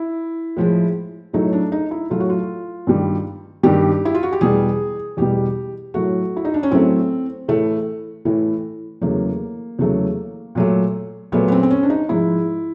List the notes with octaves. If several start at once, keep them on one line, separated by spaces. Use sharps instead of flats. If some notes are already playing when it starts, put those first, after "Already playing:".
Already playing: E4
A2 F3 G#3
A2 F#3 A3 D#4
D4
D#4
E4
A2 F#3 A3 F4
F#4
F4
G2 D#3 G3
G2 D#3 G3 G4
E4
F4
F#4
G4
E2 B2 G3 G#4
E2 B2 G3 G4
A2 F#3 A3 F#4
E4
D#4
D4
C#4
A2 F#3 A3 C4
A2 E3 A3
A2 E3 A3
E2 C#3 F#3 A3 A#3
E2 C#3 F#3 A3
A#2 F#3 A3
A#2 F#3 A3 B3
B3
C4
C4
C#4
D4
D#4
G#2 F3 G#3 E4